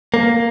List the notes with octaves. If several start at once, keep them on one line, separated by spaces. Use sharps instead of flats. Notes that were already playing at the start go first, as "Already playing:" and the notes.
A#3